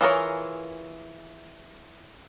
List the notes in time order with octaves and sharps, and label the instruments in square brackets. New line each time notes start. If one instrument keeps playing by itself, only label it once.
[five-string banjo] E3 F4 G#4 A#4 C#5